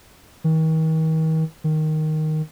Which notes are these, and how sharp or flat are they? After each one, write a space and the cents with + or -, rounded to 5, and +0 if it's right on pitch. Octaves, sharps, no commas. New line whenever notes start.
D#3 +40
D#3 +0